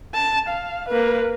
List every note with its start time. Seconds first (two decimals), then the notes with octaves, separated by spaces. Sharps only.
0.14 A5
0.49 F5
0.89 A#3 B4